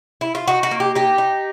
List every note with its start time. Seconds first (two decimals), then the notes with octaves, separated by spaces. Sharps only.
0.21 E4
0.35 F4
0.48 D#4 F#4
0.63 F#4
0.71 A#3
0.80 G4
0.95 D#4 G4
1.18 D#4